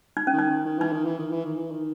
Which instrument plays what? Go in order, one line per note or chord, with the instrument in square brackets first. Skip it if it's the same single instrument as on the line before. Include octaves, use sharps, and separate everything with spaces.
[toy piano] D#4
C#4
[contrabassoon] D#3
[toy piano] D#4
[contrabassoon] D#3
D#3
[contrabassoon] E3 [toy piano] D#4
[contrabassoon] D#3
E3
D#3
E3
D#3
E3
D#3